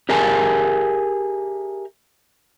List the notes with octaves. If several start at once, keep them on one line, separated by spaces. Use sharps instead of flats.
G4 G#4 A#4 E5 G#5 A5